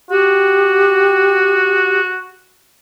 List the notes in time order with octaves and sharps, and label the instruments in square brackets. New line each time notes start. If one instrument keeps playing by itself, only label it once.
[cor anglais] F#4 [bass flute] G4